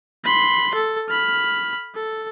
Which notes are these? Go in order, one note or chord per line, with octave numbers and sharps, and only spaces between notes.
B5 C6
A4
B5 F6
A4